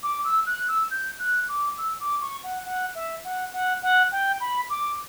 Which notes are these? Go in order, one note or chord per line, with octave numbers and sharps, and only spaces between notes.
D6
E6
F#6
E6
G6
F#6
D6
E6
D6
C#6
F#5
F#5
E5
F#5
F#5
F#5
G5
B5
D6